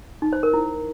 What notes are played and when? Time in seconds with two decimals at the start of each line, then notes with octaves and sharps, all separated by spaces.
0.22 D#4
0.33 C5
0.43 A#4
0.54 E4